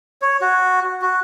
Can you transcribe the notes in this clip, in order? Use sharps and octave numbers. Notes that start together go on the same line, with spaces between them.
C#5
F#4
F#4